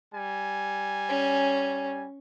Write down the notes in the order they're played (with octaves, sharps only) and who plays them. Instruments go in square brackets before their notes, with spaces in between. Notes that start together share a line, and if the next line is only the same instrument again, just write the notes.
[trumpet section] G3 G#5
[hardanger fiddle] C#4